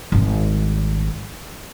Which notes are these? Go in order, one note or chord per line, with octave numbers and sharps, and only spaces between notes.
G#1 G3